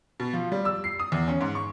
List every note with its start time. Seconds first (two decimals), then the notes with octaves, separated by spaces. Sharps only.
0.20 B2
0.33 F3
0.52 G3
0.65 E6
0.84 C7
1.00 D#6
1.12 E2
1.28 C#4
1.41 G#2
1.55 C#6